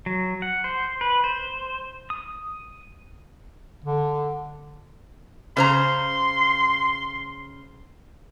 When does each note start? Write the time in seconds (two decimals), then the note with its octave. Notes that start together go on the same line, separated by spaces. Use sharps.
0.06 F#3
0.42 F#5
0.64 C5
1.01 B4
1.24 C5
2.10 D#6
3.84 D3
5.57 C#3 C5 A#5 C6